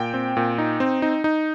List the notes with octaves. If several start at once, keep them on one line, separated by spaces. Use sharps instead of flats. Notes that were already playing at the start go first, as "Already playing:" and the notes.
Already playing: A#2 G5
C4
A#2
D#4
C4
D#4
D#4